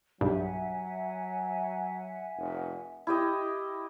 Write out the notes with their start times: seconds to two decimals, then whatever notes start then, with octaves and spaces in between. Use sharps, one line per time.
0.21 B1 G2 F#3 E5 F#5 G#5
2.37 F1
3.07 E4 G4 D#5